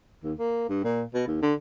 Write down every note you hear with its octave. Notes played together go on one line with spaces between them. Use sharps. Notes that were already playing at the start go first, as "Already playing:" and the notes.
D#2
A#3
G2
A#2
B2
D#2
D3